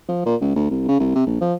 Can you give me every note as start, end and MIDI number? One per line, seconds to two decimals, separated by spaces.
0.09 0.24 53
0.26 0.36 46
0.41 0.55 37
0.56 0.71 38
0.71 0.87 36
0.88 0.99 49
1.00 1.12 36
1.15 1.25 48
1.27 1.36 34
1.41 1.54 53